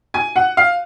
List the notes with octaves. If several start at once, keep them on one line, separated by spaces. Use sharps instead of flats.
G#5
F#5
F5